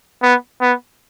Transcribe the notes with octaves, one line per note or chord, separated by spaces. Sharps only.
B3
B3